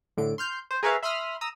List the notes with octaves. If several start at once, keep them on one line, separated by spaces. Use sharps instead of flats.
A2 D3 D7
C6 F6 G6
C5
G#4 A#4 B4 C#5 E5 F5
E5 B5 C6 D#6 F6
A#5 D#6 E6